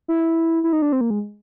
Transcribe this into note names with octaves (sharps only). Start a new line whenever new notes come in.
E4
E4
D#4
D4
C4
A#3
G#3